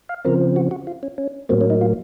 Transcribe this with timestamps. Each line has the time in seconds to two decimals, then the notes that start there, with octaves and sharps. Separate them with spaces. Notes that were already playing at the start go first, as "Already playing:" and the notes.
0.09 F5
0.25 C#3 F3 C4 A#4
0.56 F#4
0.71 F#4
0.87 F4
1.03 C#4
1.18 C#4
1.49 A2 F#3 A#3 C4
1.61 C#4
1.70 D#4
1.81 F4